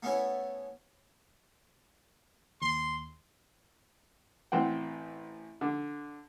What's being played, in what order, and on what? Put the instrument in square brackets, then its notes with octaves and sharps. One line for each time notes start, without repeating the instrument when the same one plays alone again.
[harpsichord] A3 B3 C#4 E4
[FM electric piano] D#2 [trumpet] C6
[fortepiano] A1 C4 F#5 G5
D3